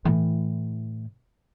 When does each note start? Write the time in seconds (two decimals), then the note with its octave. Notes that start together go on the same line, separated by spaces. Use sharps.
0.05 A2 E3